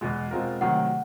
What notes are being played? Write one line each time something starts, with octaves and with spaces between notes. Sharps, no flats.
E2 B2 G#3
B2 G#3 C4 F4 A#4
C3 D#3 F#3 A3 F#5